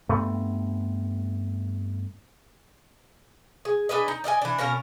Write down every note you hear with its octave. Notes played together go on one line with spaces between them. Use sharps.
G2 A3 B3 C4
G#4
D4 G#4 B4 D#5
D#4
D5 D#5 F5 G#5
E3 D4
B2 A#3 C#4 A#4